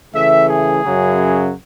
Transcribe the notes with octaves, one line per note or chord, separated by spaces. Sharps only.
C#3 E3 A3 E5
G#4
F#2 C#3 F#3